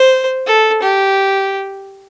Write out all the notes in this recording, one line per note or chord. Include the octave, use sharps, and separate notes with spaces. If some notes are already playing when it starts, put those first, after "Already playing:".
Already playing: C5
A4
G4